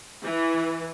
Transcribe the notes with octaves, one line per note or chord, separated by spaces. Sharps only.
E3